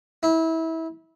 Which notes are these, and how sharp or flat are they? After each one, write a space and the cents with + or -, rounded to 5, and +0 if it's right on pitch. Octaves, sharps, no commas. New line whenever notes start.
E4 -25